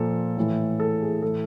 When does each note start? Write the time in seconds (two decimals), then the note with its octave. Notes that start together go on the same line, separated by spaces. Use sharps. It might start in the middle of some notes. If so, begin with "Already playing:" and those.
Already playing: A#2 F3 A4
0.37 A2 E3
0.80 A4
1.01 G#4
1.22 A2 E3 A4